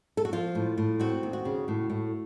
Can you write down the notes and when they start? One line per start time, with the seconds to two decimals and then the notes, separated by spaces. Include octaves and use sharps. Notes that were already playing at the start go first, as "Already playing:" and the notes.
0.17 A4
0.25 F#4
0.33 F3 F4
0.55 A2
0.78 A2
0.99 C4 F#4
1.23 D#2
1.33 F#4
1.45 C#3
1.68 A2
1.90 A2